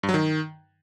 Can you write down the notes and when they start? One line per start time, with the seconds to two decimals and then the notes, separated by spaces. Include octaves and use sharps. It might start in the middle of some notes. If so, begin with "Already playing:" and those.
0.03 G2
0.09 F#3
0.14 D#3